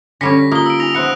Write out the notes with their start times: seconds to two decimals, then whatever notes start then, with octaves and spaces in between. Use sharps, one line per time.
0.21 D3 G3 C#4 G#5 A#6 B6 C#7
0.52 A#3 F4 D#6 G7
0.66 E6 D7
0.80 D#4 G#5 A#6 F7
0.94 F3 B3 C5 E5 F#5 F#6 C#7